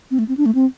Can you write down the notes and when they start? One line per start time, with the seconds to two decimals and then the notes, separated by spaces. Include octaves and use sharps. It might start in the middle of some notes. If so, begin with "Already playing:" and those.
0.11 C4
0.19 A3
0.28 C4
0.37 D4
0.46 A3
0.55 C4